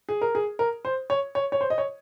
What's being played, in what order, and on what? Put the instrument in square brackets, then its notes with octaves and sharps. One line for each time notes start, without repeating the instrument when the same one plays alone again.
[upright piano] G#4
A#4
G#4
A#4
C5
C#5
C#5
C#5
C5
D#5
C#5